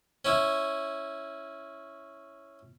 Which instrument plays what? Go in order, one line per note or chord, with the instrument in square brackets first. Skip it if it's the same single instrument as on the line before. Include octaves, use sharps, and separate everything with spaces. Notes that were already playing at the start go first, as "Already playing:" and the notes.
[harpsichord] C#4 E4